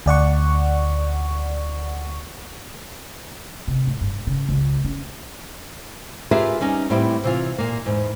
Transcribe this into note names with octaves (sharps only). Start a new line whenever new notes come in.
D2 D5 F#5 C#6
C3
G#2
G2
C#3
C#2
C#4
F4 G4 G#4 A#4 B4 E5
G3 C#4 D#4
A2 G3 B3 C4 E4 G4
C3 E3 F4
A#2 A#3
E2 G#2